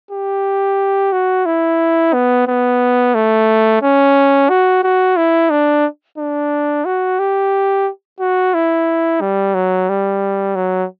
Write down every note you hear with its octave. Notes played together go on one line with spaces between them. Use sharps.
G4
F#4
E4
B3
B3
A3
C#4
F#4
F#4
E4
D4
D4
F#4
G4
F#4
E4
G3
F#3
G3
F#3